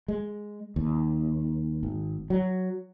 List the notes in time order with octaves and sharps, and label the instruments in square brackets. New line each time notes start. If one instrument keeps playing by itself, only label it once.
[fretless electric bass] G#3
D#2
G#1
F#3